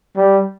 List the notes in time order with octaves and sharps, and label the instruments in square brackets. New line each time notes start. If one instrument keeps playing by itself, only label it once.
[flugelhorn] G3